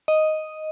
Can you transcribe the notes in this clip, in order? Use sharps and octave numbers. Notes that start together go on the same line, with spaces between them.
D#5